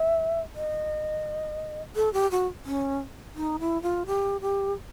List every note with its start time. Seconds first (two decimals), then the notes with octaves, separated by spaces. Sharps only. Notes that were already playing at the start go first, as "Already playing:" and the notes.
Already playing: E5
0.55 D#5
1.96 A4
2.13 G4
2.31 F#4
2.65 C#4
3.36 D#4
3.60 E4
3.82 F4
4.06 G4
4.41 G4